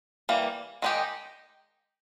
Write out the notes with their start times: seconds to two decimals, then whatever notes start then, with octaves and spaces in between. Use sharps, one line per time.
0.29 E3 G3 A#3
0.82 D#3 G#3 D#4 G4